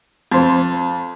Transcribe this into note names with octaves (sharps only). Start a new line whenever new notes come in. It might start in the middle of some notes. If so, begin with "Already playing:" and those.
F2 C5